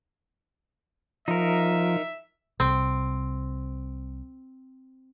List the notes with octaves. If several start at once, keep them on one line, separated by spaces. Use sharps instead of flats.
F3 D#4 A#4 E5
C2 C4